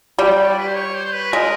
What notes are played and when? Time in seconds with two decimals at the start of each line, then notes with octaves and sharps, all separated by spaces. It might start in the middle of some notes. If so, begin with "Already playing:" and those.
0.19 G3 G5
0.43 C#5
0.47 D5
0.59 B4
0.68 C5
0.76 C#5
0.95 C5
1.05 C5
1.13 B4
1.32 G#3 A#4